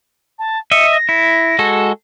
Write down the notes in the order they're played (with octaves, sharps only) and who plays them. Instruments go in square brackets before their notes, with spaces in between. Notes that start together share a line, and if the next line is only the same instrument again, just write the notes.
[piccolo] A5
[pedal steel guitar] D#5 E5 [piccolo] C#7
[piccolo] A#6
[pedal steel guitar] E4
G#3 F#4 A4